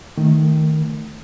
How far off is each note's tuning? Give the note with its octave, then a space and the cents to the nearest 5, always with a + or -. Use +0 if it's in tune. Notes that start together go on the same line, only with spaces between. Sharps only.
D#3 +0 A3 +0